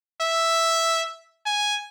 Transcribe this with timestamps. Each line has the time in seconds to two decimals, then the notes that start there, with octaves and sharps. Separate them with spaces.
0.21 E5
1.46 G#5